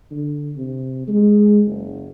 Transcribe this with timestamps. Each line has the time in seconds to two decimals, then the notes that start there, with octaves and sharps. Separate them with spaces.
0.11 D3
0.56 C3
1.08 G#3
1.65 F#1